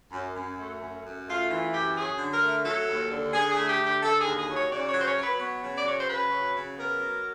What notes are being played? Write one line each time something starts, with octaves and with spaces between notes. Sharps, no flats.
F#2
F#2
A3
F#2
F#2
A3 F4
E3 F4
F#2 G4
F#3 G#4
D3
A#4
A3
F#3 A4
D#2
D3
D3 G#4
G#4
A3
G4
D3
G4
D3 A4
G#4
D#2
G#4
F#3
C#5
C#3 D5
C#5
F#3 C5
C#5
F#3
B4
B3 C#5
C#3
D5
F#3 C#5
C5
C#3 B4
F#3
C#3
B3 A#4
F#3